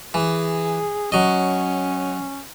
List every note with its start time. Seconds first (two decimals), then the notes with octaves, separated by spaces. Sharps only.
0.14 E3 G#4
1.12 F#3 C#4 D#5